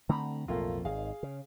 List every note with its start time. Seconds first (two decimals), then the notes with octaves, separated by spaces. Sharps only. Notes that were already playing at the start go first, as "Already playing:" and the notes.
0.09 D3 A3 C4 A#5 B5
0.48 B1 F2 A2 A3 A#3 F4
0.85 G#1 D#3 G#4 F5
1.23 C#3